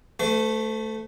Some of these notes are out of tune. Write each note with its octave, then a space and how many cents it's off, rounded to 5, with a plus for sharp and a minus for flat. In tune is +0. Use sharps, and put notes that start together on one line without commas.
A3 +0 C5 -45